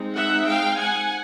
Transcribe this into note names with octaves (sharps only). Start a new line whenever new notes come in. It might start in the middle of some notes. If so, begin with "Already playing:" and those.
Already playing: G#3 C4 D#4
E5 F#5
F5 G5
F#5 G#5